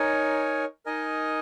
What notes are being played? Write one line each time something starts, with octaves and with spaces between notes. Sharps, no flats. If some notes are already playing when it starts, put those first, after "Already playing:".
Already playing: D#4 A#4 C#5 G#5
D#4 A#4 D#5 G#5